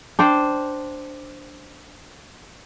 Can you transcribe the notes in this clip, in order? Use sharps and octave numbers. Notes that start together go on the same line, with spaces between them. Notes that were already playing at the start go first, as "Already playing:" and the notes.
D4 C5 G5